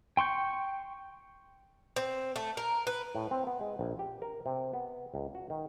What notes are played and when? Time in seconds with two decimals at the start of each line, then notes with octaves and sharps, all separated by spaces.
0.17 G5 C6 C#6 G6
1.96 C4
2.36 A3
2.57 A#4
2.87 B4
3.15 A2
3.31 C4
3.47 B3
3.61 G#3
3.79 A#1
3.99 G4
4.22 A#4
4.46 C3
4.73 B3
5.14 C#2
5.35 F#4
5.50 D#3